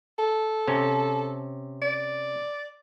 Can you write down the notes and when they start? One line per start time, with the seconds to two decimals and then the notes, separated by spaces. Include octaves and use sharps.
0.19 A4
0.68 C3 C#4
1.82 D5